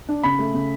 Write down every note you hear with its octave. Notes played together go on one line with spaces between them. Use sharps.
D4
C#3 B5
A3
C#3